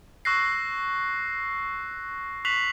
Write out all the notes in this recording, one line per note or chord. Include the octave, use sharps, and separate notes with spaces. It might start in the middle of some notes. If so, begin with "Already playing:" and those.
C#6 E6 F#6 A#6 C7
C#6 F#6 B6 C7 F7 F#7